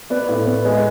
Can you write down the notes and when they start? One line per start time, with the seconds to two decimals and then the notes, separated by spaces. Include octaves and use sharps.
0.10 B3 B4 D5
0.29 A2
0.46 B3
0.65 G#3